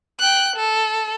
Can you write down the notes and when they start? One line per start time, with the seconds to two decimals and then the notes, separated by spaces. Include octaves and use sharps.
0.20 G5 F#6
0.56 A4